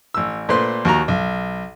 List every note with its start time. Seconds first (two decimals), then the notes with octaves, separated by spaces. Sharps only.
0.14 A1 E6
0.49 A#2 A3 B4 C5 C6
0.85 D#2 F#4 A#5
1.08 B1